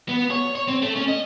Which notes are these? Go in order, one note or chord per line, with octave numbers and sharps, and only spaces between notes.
B3
C#5
C#5
C4
A3
C#4
D#5